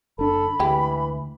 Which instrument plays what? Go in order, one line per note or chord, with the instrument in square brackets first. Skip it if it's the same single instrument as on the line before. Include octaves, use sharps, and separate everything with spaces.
[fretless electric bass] F#1 D4 [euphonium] A4 [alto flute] B5
[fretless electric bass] D2 [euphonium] E3 [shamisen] G#3 G4